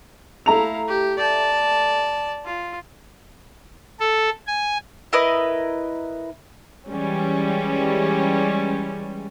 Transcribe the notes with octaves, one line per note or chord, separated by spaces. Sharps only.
A3 E4 F5 A#5 F7
G4
D5 A5
F4
A4
G#5
E4 A#4 B4 D#5
E3 G3 G#3 C#4